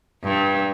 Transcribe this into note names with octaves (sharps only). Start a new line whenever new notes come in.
G2